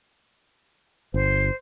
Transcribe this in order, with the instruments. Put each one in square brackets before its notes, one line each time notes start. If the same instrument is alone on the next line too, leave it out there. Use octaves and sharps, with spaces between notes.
[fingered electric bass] G1 [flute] C5